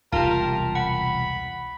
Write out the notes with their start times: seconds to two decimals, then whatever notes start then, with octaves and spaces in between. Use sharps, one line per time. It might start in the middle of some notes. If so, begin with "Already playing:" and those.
0.12 E1 C2 F4 G4 A#4 A5
0.75 F#5 B5